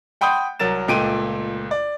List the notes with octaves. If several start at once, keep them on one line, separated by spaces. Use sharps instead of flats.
F#5 G5 B5 C6 D#6 G6
C2 F#3 A#4 A6 E7
C#2 A#2 A3 G5 D7 D#7
D5